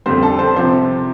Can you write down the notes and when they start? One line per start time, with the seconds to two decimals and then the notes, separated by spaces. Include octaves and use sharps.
0.06 F2 D3 G3 C4 C5
0.23 A4
0.39 C5
0.56 C3 F3 C4 C5